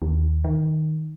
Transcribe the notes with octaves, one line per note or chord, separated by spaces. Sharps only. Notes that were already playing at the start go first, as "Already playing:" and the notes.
D#2
D#3